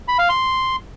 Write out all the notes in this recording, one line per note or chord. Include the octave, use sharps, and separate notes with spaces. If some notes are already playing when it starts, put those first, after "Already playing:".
B5
F5
C6